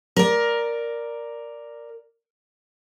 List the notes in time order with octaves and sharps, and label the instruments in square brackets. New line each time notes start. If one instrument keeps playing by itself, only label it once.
[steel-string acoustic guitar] A#4 D5